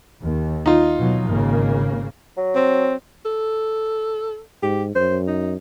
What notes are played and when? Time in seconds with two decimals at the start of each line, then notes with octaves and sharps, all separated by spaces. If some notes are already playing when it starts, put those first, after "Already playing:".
0.22 D#2
0.66 D#4 F4
0.98 B2 F#3
1.29 G#1 C#3 A#3
2.37 F#3
2.55 C4
3.25 A4
4.63 G#2 G4
4.95 F#2 C5
5.27 D#4